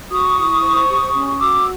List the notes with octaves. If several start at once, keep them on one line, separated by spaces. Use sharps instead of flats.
F#4 C#6 D#6
E4
C5
G4
C#4
F#4 D6 E6